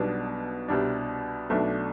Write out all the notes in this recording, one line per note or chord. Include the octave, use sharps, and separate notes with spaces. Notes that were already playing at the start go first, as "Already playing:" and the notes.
Already playing: B1 B2 G3 B3 D4
C2 B2 G3 D4
B1 B2 A3 D4